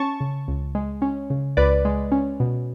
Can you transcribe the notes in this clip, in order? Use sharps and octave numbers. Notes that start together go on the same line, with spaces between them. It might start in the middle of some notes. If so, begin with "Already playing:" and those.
Already playing: C#4 A5 C#6
C#3
C#2
G#3
C#4
C#3
C#2 B4 D5
G#3
C#4
B2